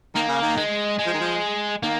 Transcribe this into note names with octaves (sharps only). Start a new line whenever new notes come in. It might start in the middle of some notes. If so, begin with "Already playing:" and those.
D#3 A#3
C#3
D#3
G#3
G#3
F3
D#3
F3
D#3 A#3